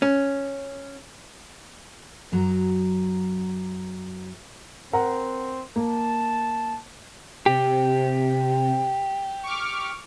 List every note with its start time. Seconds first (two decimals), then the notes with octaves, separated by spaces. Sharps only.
0.02 C#4
2.32 F#2 F#3 A#5
4.93 C4 A#4 F#5 A#5
5.76 A#3 A5
7.46 C3 G4
9.43 C#6 D6 F6